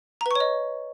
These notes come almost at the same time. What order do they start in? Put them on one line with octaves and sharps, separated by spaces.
A#5 B4 C#6 C#5 D#5